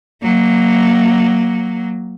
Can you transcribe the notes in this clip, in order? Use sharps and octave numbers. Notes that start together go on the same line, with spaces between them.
F#3 A#3